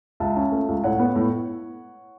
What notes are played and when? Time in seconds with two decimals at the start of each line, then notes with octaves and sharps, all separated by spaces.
0.20 C#2 E5 A5
0.36 C#4
0.52 A3
0.68 C#2
0.83 A2 C#5 F#5
0.99 B3
1.16 A2